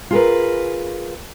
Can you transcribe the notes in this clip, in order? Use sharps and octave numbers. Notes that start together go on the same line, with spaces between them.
F4 G#4 A#4 B4